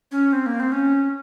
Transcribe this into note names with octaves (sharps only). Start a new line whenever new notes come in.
C#4
C4
A#3
C4
C#4